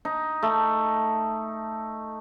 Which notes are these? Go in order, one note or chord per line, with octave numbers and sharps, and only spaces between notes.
D#4
A3